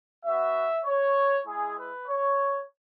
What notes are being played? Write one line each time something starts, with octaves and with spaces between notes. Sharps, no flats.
B3 F#4 E5
C#5
G#3 E4 G#4
B4
C#5